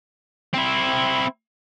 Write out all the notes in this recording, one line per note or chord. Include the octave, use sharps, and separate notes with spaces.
C4 E4